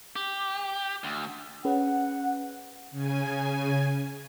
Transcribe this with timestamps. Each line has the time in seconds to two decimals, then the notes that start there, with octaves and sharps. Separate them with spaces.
0.16 G4
1.04 D2
1.65 C#4 G#4 B4 F#5
2.91 C#3 G#5